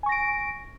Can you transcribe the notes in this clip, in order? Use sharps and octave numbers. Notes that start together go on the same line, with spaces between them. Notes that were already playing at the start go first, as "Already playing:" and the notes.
G#5 C#6 A#6 D7